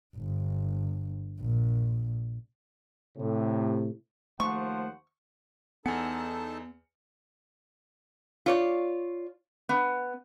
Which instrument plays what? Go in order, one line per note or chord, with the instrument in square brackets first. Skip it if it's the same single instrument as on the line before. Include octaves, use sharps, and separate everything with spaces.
[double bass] G1
A#1
[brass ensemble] A2 C3
[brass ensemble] D#2 C5 F#5 [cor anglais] F3 [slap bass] A3 [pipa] C#6
[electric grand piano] E2 G#5 C#7 [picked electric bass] B3 [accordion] D#4 A4 A5
[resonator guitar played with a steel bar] F4 C#5 D5
B3